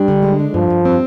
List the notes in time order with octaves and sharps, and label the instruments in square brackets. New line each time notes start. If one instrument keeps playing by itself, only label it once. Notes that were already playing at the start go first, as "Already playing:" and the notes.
Already playing: [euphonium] G3 [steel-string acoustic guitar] D4
[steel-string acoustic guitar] D3
G#3
D4
[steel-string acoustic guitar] G2 [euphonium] F3
[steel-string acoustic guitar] G2
C4